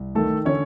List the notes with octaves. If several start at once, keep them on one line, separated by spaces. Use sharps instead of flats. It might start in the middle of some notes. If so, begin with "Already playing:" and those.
Already playing: C2
D#3 A3 A4
D3 C#4 C#5